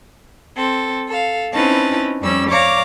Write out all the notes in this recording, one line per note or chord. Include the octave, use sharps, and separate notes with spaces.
C4 A4
A4 F5
C4 C#4 D#4 E4 B4 A5
F2 G3 C#4 E6
C#5 D5 F5 A#5 D6